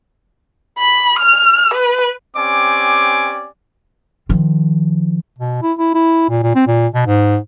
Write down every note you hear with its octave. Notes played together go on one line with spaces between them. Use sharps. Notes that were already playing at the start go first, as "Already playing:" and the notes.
B5
F6
B4
C4 C#4 G4 D5 G#5 D6
D#3 F3
B2
E4
E4
E4
A#2
A#2
C4
A#2
B2
G#2